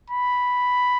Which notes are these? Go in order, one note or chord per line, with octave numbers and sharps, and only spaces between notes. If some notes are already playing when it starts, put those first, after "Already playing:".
B5